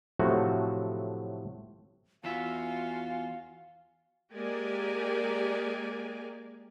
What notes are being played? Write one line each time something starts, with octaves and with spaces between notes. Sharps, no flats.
A2 C3 F3 F#3 A3 F#4
E2 F4 F#4 E5 F5 G#5
G#3 A#3 G4 A#4 D5 G#5